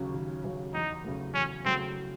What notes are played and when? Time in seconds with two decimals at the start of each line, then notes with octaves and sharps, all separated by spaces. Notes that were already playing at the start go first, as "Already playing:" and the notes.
Already playing: D#2 C#3 F#3 C#4
0.15 D#2
0.44 C#3 F#3 C#4
0.74 E2 D#4
1.04 C#3 F#3 A3
1.34 E2 C#4
1.65 C#3 F#3 A3 C4